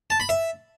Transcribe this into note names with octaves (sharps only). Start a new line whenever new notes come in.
A5
B5
E5